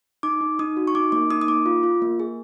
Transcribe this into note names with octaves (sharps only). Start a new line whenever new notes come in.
D#4 D6
D#4
D#4 D#6
F#4
C#6
D#4 D6
A#3 D6
D#4 D#6
D#6
A#3 D6
F4
F4
A#3
G#4